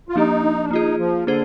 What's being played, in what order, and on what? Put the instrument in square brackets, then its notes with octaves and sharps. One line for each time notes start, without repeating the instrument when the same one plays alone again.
[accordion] F4
[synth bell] F3 A#3 D4 G4 [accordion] D#4
[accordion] D4
[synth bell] A#3 F4 G#4 [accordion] D#4
[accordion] F3
[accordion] D3 [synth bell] A#3 D4 G#4 C5